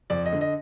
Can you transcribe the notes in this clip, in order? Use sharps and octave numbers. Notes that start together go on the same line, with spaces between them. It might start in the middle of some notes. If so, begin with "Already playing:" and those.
F2 D5
D#5
D3
D#5